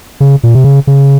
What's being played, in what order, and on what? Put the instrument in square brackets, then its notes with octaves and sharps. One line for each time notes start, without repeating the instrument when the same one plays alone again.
[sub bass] C#3
A#2
C3
C#3
C#3